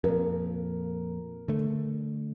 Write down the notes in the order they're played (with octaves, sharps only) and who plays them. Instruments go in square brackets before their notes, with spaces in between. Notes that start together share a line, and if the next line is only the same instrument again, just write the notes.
[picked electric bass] F2 A#2 [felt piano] A#4
[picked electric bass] D3 A3